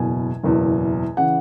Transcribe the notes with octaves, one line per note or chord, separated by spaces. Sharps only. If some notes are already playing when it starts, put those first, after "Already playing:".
Already playing: F#1 E2 B2 G#5
F#1 E2 B2
C#3 E3 F#5